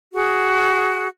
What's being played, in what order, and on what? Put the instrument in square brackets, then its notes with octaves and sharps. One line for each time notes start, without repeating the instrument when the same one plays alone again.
[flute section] F#4 G#4 F#5